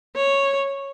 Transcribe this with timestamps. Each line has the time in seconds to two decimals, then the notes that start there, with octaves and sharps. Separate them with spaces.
0.16 C#5